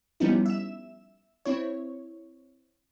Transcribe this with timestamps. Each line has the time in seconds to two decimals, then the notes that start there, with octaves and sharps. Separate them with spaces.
0.20 F3 G3 B3 C#4 D#4 E4
0.46 E5 E7
1.45 C4 E4 C#5